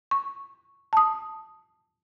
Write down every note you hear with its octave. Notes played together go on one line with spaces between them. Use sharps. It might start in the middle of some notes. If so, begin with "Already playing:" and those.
C#6
A5 D#6